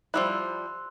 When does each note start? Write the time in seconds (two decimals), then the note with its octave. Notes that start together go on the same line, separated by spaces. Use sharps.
0.14 F3 G3 E4 C6 E6 F#6